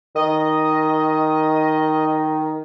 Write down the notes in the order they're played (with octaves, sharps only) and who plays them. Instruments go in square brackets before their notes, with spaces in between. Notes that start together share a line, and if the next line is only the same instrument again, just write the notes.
[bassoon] D#3 [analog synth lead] D#5